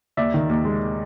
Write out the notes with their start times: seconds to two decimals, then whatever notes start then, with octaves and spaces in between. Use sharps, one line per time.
0.17 D#2 D5 E5
0.34 D#3
0.49 D#2
0.65 G#3